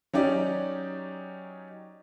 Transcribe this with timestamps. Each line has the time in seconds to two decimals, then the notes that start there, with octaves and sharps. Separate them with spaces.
0.13 F#3 C#4 D#4 G4 D5